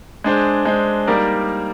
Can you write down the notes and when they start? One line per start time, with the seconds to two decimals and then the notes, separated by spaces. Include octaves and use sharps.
0.24 G#3 D4 G#4 C5
0.65 G#3 D4 G#4 C5
1.07 G3 A#3 D#4 A#4 D5